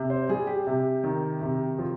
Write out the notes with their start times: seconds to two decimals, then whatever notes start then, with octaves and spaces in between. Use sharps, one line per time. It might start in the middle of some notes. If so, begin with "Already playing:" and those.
Already playing: C3
0.10 C5
0.29 G3 G#4
0.47 G4
0.67 C3
1.04 D#3
1.41 C3
1.78 F3